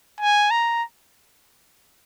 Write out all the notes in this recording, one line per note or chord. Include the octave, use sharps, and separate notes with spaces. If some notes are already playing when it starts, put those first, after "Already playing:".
G#5
A#5